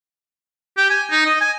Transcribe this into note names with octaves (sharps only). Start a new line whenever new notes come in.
G4
G#5
D#4
D#5
G#5